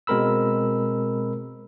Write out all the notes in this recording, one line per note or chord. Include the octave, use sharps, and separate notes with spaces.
B2 G#3 C4 A#4 B5 E6